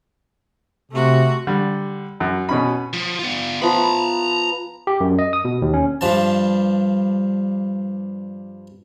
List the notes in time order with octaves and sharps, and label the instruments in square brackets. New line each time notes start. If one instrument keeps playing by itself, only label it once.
[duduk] C3 [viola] A3 F#4
[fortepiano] D3 G3
F#2
B2 C#4 B5
[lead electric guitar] F3
B3 F4
[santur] F3 B3 [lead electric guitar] A#5 B5
[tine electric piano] G4
F#2
D#5
D#6
B2
D#2
C#4
[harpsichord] G2 F3 A5